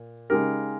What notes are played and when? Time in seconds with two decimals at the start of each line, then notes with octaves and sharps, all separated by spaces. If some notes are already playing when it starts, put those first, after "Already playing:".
Already playing: A#2
0.30 C#3 G#3 D#4 G4 A#4